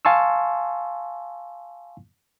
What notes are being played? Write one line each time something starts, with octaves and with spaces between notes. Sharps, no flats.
F5 G#5 A5 C6 C#6 E6